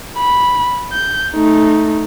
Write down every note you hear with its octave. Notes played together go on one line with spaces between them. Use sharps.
B5
G6
A3 D#4